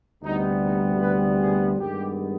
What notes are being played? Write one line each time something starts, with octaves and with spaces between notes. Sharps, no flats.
D2 C3 G3 B3 D#4
D#4
B4
G#4
G2 D#3 G#3 B3 G4